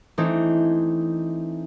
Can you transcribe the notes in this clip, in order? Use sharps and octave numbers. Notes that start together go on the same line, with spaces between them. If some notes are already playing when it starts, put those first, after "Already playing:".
E3 A3 C4 D4 D#4